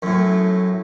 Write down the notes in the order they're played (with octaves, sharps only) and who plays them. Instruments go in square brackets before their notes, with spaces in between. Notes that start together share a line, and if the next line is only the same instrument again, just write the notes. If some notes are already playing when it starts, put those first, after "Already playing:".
[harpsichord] F#2 A2